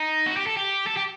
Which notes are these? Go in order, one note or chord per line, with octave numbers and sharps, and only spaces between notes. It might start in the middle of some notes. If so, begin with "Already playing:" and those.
Already playing: D#4
F#4
G4
A4
G4
A4
G4